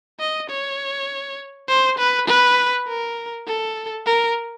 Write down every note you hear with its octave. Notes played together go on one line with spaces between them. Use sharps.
D#5
C#5
C5
B4
B4
A#4
A4
A#4